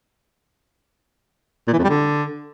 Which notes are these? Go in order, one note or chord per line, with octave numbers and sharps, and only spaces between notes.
A#2
E3
F2
G3
D3